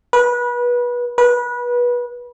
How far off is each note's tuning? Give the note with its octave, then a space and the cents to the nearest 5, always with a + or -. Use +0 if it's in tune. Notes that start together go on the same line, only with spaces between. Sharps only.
B4 -25
B4 -25